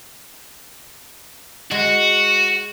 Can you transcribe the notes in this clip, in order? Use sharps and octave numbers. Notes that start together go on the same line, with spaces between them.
G#3 F#4